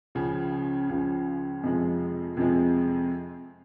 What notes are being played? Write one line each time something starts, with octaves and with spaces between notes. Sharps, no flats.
C#2 C#3 F3
C#2 C#3 F3
F2 C3 F3 G#3
F2 C3 F3 G#3